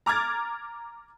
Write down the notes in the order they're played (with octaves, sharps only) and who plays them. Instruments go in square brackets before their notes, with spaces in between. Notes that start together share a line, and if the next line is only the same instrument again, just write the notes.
[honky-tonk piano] A#5 D6 F6 G#6 A6